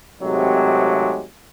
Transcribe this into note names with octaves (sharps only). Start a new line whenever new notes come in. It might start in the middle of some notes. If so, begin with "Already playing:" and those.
G#1 C3 F#3 G#3 A3 G4